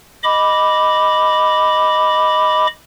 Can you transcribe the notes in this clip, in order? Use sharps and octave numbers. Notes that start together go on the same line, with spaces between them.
D#5 B5 D6